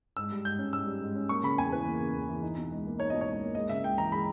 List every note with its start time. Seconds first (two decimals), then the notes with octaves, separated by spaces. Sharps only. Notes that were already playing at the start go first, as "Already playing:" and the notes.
0.17 G#2 E6
0.32 G3
0.45 G#2 G6
0.59 C#4
0.73 G#2 E6
0.87 G3
1.01 G#2
1.15 C#4
1.29 A#3 C#6
1.43 C#3 B5
1.57 E2 G#5
1.72 E3 B4
1.86 A#3
2.00 C#3
2.15 E2
2.29 E3
2.42 D#4
2.57 B2
2.71 C#2
2.85 A#3
2.99 D#4 C#5
3.10 B2 D#5
3.21 C#5
3.27 C#2
3.41 A#3
3.55 G#3 D#5
3.69 C#3 E5
3.83 C#2 G5
3.98 E3 A#5
4.11 G#3 B5